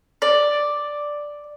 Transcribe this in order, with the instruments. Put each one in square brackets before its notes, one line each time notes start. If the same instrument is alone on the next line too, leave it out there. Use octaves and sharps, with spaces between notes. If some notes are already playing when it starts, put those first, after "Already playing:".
[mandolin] D5